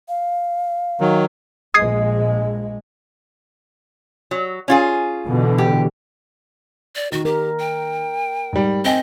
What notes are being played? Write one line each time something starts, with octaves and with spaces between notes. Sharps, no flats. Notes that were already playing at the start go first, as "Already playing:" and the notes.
F5
D#3 F#3
A#1 G#3 D#6 G#6 C7
F#3
C#4 F4 G#4
B2 D3 E3
G4
D5
D#3 F#4
G4 A#4
G5
G#2 G3
C4 D#5 G5 G#5